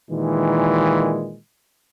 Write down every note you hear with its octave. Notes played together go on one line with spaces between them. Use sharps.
A#2 D#3 E3 G#3